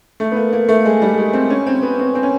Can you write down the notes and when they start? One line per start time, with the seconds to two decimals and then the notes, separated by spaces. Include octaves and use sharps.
0.20 A3
0.32 B3
0.36 A#3
0.53 A#3
0.69 A3
0.85 G#3
1.02 G3
1.18 G#3
1.33 C4
1.50 C#4
1.67 C4
1.83 B3
1.99 C4
2.15 C4
2.23 C#4